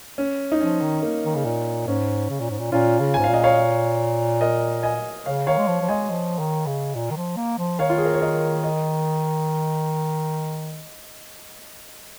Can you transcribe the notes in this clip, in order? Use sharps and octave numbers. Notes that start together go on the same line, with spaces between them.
C#4
D#4
F3 C#4
D#3
A#3
D#3
C#3
A#2
G#2 C#4
C#3
A#2
G#2
A#2
A#2 C#4 F4
C#3
G#2 G#5
F5
A#2 D#5
C#5 F5
A#4 D#5
D#5 G#5
C#3 C#5 F5
D#3 C#5 F5
G#3
F3
F3
G#3 D#5 G#5
F3
D#3
C#3
A#2
D#3
F3
A#3
F3
D#3 C#5 F5
F4
G#4
A#4
C#5
A#4 D#5
D#5